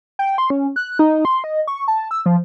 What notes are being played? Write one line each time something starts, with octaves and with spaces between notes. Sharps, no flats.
G5
C6
C#4
F#6
D#4
C6
D#5
C#6
A5
E6
F3